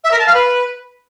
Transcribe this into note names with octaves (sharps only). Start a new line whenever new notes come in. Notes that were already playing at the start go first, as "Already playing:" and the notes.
E5
A#4
A5
F5
B4